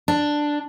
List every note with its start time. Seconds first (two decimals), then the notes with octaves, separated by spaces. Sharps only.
0.08 D4